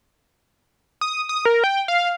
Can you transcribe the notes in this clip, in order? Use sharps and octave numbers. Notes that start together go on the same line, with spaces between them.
D#6
D#6
A#4
G5
F5